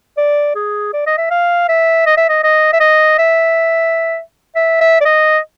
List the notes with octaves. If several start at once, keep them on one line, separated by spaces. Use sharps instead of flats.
D5
G#4
D5
D#5
E5
F5
E5
D#5
E5
D#5
D#5
E5
D#5
E5
E5
E5
D5
D#5